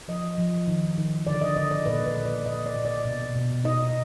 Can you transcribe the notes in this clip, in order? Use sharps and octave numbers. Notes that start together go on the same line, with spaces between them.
F3 D#5
F3
D#3
D#3
D3 D5
D#5
D3 D#5
D5
A#2 B4
B4
A#2
D5
A#2 D#5
D5
A#2
D5
B2
B2
D#4 D#5